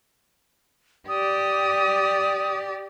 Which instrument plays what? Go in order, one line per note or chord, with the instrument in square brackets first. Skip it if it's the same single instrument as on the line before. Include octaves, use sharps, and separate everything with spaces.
[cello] G4 D5 [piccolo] D#6